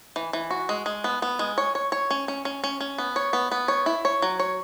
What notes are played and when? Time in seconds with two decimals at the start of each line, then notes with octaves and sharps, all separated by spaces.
0.16 E3
0.33 E3
0.51 F#4
0.69 G#3
0.86 G#3
1.04 B3
1.22 B3
1.39 G#3
1.58 C#5
1.75 C#5
1.92 C#5
2.11 C#4
2.28 C#4
2.45 C#4
2.64 C#4
2.81 C#4
2.98 B3
3.16 C#5
3.33 B3
3.52 B3
3.68 C#5
3.86 E4
4.05 C#5
4.22 F#3
4.39 C#5